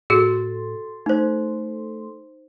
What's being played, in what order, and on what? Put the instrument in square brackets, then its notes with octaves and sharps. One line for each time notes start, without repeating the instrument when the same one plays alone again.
[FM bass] A2 [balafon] F#4 G#4 [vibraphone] A4 C6
[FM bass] A3 [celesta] D#4 C5